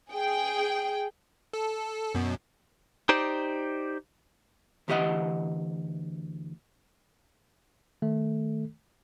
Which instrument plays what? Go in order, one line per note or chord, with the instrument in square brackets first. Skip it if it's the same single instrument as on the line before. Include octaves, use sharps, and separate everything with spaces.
[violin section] G#4 G5
[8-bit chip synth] A4
F#2 B2
[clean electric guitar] D#4 G4 C5 D5
[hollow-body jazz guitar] D2 E3 G4 B4 D#5 F#5
[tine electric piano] D#3 A3 A4